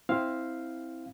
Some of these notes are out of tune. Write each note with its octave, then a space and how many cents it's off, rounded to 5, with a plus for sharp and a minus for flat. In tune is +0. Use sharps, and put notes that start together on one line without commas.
C4 +0 E4 -10 F5 +0